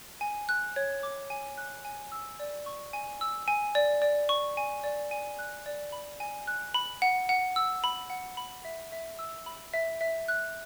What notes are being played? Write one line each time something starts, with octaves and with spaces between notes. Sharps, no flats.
G#5
F#6
C#5
D6
G#5
F#6
G#5
E6
D5
C#6
G#5
E6
G#5
D5
D5
C#6
G#5
D5
G#5
F#6
D5
B5
G#5
F#6
B5
F#5
F#5
E6
B5
F#5
B5
E5
E5
E6
B5
E5
E5
F#6